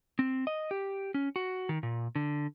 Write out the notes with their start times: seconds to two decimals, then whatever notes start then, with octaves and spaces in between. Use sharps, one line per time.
0.19 C4
0.47 D#5
0.71 G4
1.14 C#4
1.36 F#4
1.69 D#3
1.83 A#2
2.15 D3